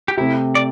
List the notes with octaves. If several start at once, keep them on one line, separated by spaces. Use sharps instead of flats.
G4
C3 A3 C4 E4
D5